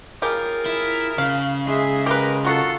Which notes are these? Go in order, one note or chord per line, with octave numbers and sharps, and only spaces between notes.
C#3 F4 G4 G#4 A#4
E4
C#3 F5
G#3 G#4 E5
G4 A#4 B4
F#3 F4 F#4 A4